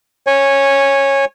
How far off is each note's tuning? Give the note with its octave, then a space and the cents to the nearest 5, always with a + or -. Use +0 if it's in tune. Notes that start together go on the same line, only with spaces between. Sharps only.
C#5 -10 G#5 -15